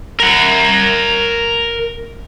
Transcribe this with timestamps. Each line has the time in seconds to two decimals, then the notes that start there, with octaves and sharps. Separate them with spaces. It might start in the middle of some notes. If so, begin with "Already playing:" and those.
0.20 A#4 F#5